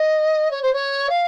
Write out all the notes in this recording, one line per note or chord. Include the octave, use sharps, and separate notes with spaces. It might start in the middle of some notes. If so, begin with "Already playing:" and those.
Already playing: D#5
C#5
C5
C#5
F5